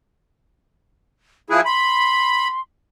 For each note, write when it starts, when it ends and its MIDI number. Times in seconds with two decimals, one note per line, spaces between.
1.50 1.61 53
1.50 1.61 64
1.50 1.61 68
1.50 1.60 90
1.65 2.48 83
1.65 2.60 84